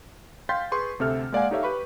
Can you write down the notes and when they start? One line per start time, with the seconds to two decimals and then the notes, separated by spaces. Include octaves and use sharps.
0.49 F5 G5 C6 G6 A6 B6
0.72 G#4 B4 C6 C#6
0.99 D2 C3 C4 A4 E5 F6
1.32 G#3 A#3 D5 F5 F#5 G#5
1.51 D#4 G4 A4 C#5 E5 F5
1.63 G4 B4 B5 C#6